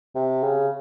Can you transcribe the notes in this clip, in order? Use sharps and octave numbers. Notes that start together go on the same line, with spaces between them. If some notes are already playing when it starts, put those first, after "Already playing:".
C3
C#3